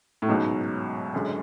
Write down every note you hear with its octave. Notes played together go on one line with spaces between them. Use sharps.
A2
C#2 G#2 B2 F#3
F#1 F#2 D3 G#3